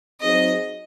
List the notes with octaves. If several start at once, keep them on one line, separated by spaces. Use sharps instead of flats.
F#3 C4 D#4 G#4 C5 D#5